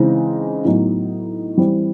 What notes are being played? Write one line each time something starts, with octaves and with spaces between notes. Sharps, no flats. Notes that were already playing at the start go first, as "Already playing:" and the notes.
Already playing: C#3 E3 G#3 C4 D#4
A2 F#3 B3 D#4
E3 G3 C4